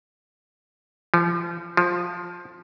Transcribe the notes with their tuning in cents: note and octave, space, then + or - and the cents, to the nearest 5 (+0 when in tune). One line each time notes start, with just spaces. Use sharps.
F3 -30
F3 +10